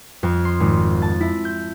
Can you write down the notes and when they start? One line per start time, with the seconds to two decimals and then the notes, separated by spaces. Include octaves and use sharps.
0.23 F2
0.45 C6
0.60 G#1
1.02 A5
1.21 E4
1.45 G6